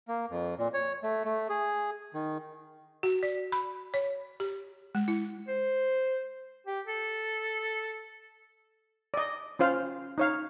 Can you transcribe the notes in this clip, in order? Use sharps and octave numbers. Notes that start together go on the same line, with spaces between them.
A#3
F2
A#2
C#5
A3
A3
G#4
D#3
F#4
D5
B5
C#5
G4
G#3
E4
C5
G4
A4
D5 D#5
C#4 F4 C5 F5
D#4 C#5 F5